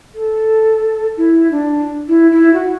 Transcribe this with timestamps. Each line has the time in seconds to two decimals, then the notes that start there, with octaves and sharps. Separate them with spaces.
0.15 A4
1.17 E4
1.51 D4
2.08 E4
2.31 E4
2.54 F#4